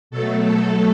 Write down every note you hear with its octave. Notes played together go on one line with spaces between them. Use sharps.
B2 F#3 A3 A4
A4